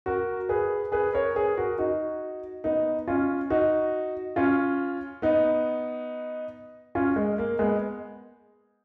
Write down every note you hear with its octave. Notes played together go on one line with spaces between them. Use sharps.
F#4 A#4
G#4 B4
G#4 B4
A#4 C#5
G#4 B4
F#4 A#4
D#4 F#4
B3 D#4
C#4 F4
D#4 F#4
C#4 F4
B3 D#4
C#4 F4
G#3
A#3
G#3 B3